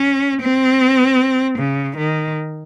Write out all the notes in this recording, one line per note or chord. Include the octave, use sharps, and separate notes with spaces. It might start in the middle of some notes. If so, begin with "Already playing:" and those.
Already playing: C#4
C4
C#3
D#3